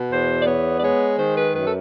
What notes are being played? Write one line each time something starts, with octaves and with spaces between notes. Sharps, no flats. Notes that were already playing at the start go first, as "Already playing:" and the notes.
Already playing: B2
E2 C5
D5
B3 C#5
D5
G#3 C#5
D#3 C5
B4
F#2 B4
A4